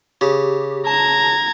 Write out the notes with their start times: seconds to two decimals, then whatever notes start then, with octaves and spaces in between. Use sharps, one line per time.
0.21 C#3 G4
0.87 A5 A#5 G#6